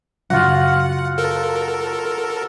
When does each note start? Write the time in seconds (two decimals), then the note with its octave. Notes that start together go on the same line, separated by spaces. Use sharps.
0.30 F#2 C#3 F#3 F4 F#4 F#5
1.18 A4 A#4